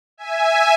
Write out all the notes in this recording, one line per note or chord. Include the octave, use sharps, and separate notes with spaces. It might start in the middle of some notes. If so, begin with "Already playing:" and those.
E5 G#5